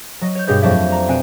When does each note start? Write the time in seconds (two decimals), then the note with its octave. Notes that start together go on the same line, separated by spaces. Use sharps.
0.21 F#3 D#5
0.35 C#5 G6
0.47 G2 B2 G3 G#4 C#5 G6
0.62 F2 F#3 A3 D5 E5 G6
0.92 A#5
1.08 B2 C4 G#5 F#6 D7